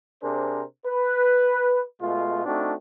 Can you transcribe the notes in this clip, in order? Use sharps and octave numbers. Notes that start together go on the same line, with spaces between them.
C3 D4 G#4 A#4 C5
B4
B2 G#3 A3 F4
A3 C4 D4 D#4 F#4